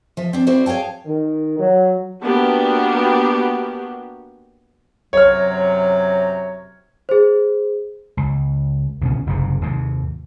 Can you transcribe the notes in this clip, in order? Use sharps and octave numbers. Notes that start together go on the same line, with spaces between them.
F3 E5
C4 D4
C4 E4 F#4 C5 D5
G#4 C#5 F5 G5 A5
D#3
F#3
A#3 B3 D4 F#4 G4
F#2 C3 F#3 C#5 F6
G#4 C5
C#2
C#2 B2 D3 C#4
F#1 G#2 C3
D#2 G#2 C3